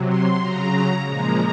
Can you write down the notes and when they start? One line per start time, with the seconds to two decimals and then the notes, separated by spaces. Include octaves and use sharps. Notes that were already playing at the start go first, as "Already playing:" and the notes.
Already playing: C3 F#3
0.08 C6
0.40 C#3 F#3 A#5
1.03 A#2 F3 G#3 A#5